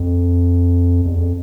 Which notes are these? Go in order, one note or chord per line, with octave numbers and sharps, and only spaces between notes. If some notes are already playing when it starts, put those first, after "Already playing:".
Already playing: F2
E2
F2